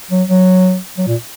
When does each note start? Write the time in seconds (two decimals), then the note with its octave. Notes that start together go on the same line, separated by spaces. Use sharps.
0.11 F#3
0.29 F#3
0.98 F#3
1.07 A#2